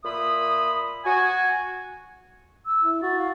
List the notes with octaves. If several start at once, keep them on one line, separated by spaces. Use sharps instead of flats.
A#2 E5 B5 D#6
F#4 G#5
E6
E4
F#4 A6
F5